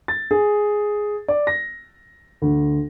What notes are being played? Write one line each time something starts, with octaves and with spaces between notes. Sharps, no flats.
A6
G#4
D5
A#6
D2